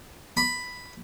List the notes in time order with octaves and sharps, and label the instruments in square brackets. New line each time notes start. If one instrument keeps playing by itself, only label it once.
[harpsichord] B5